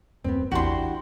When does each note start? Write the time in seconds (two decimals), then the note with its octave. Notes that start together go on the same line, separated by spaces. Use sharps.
0.24 D#1 F#2 B3 C4
0.52 A1 E2 D4 E4 F#4 G4 C6